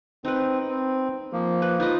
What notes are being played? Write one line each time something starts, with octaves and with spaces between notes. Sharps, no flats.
C4 D#4 B4
C4
F3 A#3
B4
D#4 F4 B4 D#5